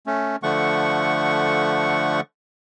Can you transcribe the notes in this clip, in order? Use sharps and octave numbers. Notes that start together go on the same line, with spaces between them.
A3 C#4
D3 F3 A3 F#5 C#6